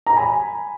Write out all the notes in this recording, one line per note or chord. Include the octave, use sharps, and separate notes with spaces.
A#5
G#5 B5